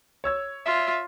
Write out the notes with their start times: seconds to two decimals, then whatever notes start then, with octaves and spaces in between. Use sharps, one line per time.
0.24 C#5 E6 G#6
0.66 F4 E5